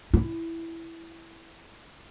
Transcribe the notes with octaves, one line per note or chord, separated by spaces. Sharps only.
E4 F4